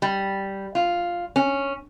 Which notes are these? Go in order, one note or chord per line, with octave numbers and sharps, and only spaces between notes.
G3
F4
C#4